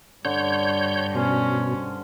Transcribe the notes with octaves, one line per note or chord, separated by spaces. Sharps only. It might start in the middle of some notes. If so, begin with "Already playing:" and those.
G2 D3 C#5 G6
B2 C#4 C5 B5